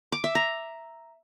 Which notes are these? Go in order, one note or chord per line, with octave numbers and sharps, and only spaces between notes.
D6
E5
A#5